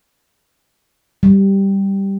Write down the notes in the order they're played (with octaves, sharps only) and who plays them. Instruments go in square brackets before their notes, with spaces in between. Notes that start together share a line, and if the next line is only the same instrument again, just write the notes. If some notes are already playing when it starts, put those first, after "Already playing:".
[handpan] G3